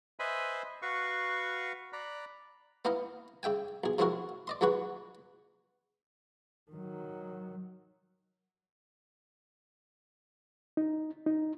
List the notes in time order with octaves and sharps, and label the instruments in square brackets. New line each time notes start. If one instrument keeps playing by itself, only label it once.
[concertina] B4 C5 D#5 E5 G#5 B5
F#4 B4 F5 C#6
D5 A#5 B5 F#6
[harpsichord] B3 D#4 E4 D#5 F5
C#3 E5 G5 G#5
B1 G#4
C3 F3 G#3 E4 F#4 A#4
D5 D#5 C6
C#2 F#3 G#3 F#4 B4
[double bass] D#3 F#3
[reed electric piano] D#4
D#4